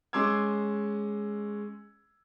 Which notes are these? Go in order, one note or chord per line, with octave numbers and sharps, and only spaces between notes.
G#3 C#4 C6 D6 E6 G#6